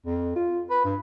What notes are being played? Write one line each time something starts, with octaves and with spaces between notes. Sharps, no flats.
F2
F4
B4
G2